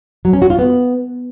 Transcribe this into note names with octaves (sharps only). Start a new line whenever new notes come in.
F#3
C#4
F#4
F4
B3